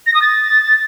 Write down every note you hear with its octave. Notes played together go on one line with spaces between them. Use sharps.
A#6
D#6
A6